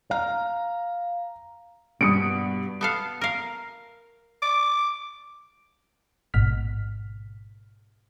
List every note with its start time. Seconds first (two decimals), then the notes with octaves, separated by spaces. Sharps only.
0.11 F5 A#5
2.01 G2 B2 B3 D#6 C#7 D7
2.81 B3 A4 F5
3.21 A#4 F5
4.42 D6
6.34 A1 G#2 B2 F6 B6